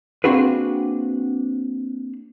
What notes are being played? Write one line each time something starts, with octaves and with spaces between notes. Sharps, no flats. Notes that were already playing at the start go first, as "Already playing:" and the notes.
A#3 C4 D4 F#4 G#4 B4